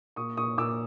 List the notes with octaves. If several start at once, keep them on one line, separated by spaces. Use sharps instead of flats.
A#2 C#6 D#6
A#2 C#6 D#6
A#2 D6 E6